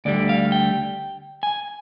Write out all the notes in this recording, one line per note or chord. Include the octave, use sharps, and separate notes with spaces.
D2 D3 G3 D5
F5
G5
G#5